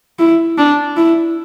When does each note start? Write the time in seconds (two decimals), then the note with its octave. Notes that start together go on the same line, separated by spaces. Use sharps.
0.19 E4
0.58 D4
0.97 E4